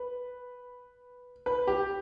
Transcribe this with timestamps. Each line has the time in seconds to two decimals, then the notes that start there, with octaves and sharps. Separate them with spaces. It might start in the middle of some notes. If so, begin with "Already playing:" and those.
Already playing: B4
1.46 B4
1.67 G4